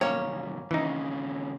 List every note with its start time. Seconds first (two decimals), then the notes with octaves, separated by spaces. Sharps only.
0.01 C2 F#2 A#3 C#4 C#5
0.71 D#2 C#3 E3 D#4